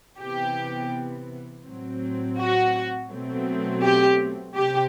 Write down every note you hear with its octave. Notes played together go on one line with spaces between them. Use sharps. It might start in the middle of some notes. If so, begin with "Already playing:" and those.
C3 E3 B3 G4
A2 F#3 C4
F#4
B2 F#3 A3 C4
G4
C3 G4